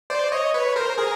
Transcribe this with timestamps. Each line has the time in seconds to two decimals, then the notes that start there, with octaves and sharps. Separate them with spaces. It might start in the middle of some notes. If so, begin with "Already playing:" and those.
0.10 C5 D5
0.32 C#5 D#5
0.54 B4 C#5
0.76 A#4 C5
0.98 G#4 A#4